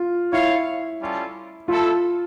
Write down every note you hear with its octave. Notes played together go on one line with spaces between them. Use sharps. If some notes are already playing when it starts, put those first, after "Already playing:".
Already playing: F4
E4 F4 C#5 F5
G3 C#4 F4 A4
A3 E4 F4 A4